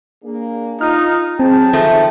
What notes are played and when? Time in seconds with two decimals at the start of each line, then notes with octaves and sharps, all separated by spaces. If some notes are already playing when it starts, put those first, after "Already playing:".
0.23 A#3 D4 G#4
0.81 D#4 F4 F6
1.39 F#3 C4 G#4 G5 A5
1.73 D#3 F3 A3